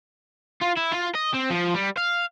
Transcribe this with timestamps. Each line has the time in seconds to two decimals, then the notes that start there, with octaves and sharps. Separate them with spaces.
0.62 F4
0.77 E4
0.92 F4
1.15 D#5
1.34 C4
1.50 F3
1.74 G3
1.98 F5